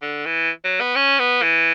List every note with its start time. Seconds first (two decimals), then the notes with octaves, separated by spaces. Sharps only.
0.02 D3
0.26 E3
0.65 F#3
0.81 B3
0.96 C#4
1.19 B3
1.42 E3